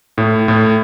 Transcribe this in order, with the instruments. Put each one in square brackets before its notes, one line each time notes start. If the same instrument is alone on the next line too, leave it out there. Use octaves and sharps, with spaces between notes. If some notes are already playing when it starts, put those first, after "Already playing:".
[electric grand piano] A2
A2